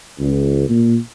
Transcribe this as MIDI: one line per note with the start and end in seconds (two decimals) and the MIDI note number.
0.19 0.66 37
0.68 0.95 46